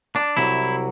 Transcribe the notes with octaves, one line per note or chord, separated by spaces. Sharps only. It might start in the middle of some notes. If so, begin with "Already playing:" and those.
D4
C2 C3 F#3 E4